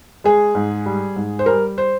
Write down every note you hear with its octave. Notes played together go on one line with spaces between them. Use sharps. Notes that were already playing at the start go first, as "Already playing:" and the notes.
G#3 G#4
G#2
G3
G#2
C5
G3 A#4
C5